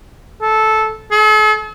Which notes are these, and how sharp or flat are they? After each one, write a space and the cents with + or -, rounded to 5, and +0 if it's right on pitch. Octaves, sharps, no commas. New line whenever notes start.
A4 -10
A4 -45